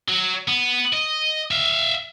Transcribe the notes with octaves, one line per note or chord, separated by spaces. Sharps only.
F#3
B3
D#5
E5 F5